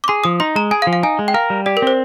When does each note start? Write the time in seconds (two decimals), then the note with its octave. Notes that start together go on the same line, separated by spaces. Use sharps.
0.04 D6
0.08 G#4 C6
0.24 F3 D#6
0.40 D#4 C6
0.56 G#3 A#5
0.71 G#4 G#5
0.82 F5
0.87 F3
0.93 F5
1.03 D#4 G#5
1.19 G#3
1.28 G5
1.34 A#4 F5
1.50 G3
1.66 G4 D5
1.77 A#4
1.82 C4 C5